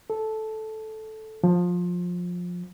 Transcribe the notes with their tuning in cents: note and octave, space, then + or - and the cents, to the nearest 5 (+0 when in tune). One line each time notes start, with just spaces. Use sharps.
A4 -10
F3 +20